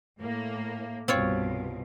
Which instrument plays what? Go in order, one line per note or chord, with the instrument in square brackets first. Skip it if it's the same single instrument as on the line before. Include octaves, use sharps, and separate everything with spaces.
[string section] A2 A#3
[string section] C2 G2 B2 [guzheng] C4 F4 C#5